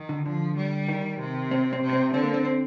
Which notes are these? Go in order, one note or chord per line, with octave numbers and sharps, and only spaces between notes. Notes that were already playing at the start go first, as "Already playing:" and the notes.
Already playing: D#3
D3
D3 F3
G3
D#3
C3
C4
C4
C3
C4
D3 C4
A#3
C4
C4